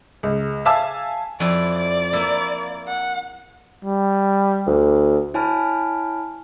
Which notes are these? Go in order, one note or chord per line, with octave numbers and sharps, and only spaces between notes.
C#2
E5 F5 G#5 A5 E6
F2 E4 D5
D5
A#3 E4
F#5
G3
D2
E4 C#5 G#5 A5 B5 F6